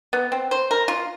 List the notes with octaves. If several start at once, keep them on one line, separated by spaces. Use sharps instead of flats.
B3
C4
C5
A#4
F4